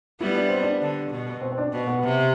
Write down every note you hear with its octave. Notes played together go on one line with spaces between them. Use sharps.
G3 B3 E4
D4
C4
D4
D3
B2
C4
C4
D4
B2
B3
C3